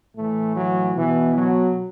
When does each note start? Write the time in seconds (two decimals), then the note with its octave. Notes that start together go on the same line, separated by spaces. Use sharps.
0.16 A2 E3 A3
0.56 F#3
0.96 B2 E3
1.35 F#3